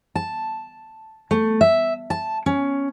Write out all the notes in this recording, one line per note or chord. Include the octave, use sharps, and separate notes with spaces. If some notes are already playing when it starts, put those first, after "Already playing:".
A5
A3
E5
A5
C#4